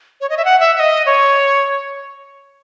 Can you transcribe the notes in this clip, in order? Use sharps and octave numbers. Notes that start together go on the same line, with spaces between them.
C#5
D#5
E5
F#5
E5
E5
D#5
C#5